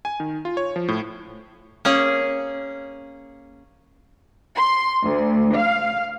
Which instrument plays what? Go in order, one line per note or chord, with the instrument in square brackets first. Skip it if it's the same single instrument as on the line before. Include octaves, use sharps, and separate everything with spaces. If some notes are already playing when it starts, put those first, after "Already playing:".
[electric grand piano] G#5
D#3
F4
C#5
F3
A2
[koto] A#3 C#4 G#4
[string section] C6
D2
F5